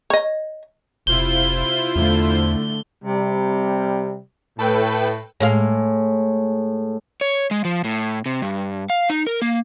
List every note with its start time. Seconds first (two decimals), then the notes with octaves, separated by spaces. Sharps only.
0.10 C#5 D#5
1.07 F1 C3 E4 F4 C5 G7
1.96 E2 D3 A3
3.04 C3 G3
4.59 A2 A4 B4 G5
5.40 A2 G#3 F5
7.21 C#5
7.51 G#3
7.65 F3
7.84 A2
8.26 C3
8.42 G2
8.90 F5
9.10 D#4
9.27 A#4
9.42 A#3